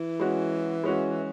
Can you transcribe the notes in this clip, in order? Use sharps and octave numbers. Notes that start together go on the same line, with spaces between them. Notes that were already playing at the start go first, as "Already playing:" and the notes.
Already playing: E3
G#3 C#4 F#4
G#3 C#4 F#4